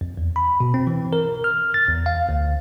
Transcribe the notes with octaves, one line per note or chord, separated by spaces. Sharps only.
F2
E2
B5
B2
C4
E3
A#4
F6
A6
E2
F5
D2